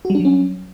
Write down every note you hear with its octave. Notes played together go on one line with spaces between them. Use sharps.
F#4
G3
D4
F#3
C#4